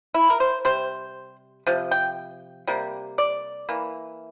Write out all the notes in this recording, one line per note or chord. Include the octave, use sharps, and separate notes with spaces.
E4
A#4
C5
C3 G3 C5
C3 F3
G5
C3 G3 A#3
D5
E3 A#3